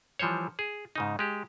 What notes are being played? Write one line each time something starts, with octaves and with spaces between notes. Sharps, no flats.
E3 F3 G3 C5 C#5
G#4
G#2 C#3 D#4
G#3 G4